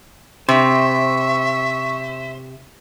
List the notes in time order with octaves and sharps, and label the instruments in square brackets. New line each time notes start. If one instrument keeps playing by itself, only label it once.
[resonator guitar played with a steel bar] C3 [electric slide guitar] C5 [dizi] E5 [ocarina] C#6